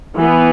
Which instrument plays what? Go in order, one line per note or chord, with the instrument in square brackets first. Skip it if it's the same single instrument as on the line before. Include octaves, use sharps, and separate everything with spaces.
[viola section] E3 B3